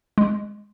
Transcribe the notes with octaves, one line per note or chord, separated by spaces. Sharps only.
G#3